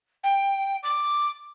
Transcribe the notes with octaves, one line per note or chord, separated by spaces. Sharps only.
G5
D6